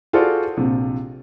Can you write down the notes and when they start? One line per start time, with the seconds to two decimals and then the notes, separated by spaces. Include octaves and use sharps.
0.13 F4 F#4 G#4 A4 C5 D5
0.57 A#1 C3